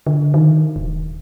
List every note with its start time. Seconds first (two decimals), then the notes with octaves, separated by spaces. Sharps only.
0.07 D3
0.34 D#3
0.76 D#1